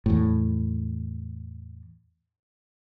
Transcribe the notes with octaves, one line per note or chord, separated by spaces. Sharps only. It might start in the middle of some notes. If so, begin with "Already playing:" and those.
E2 A2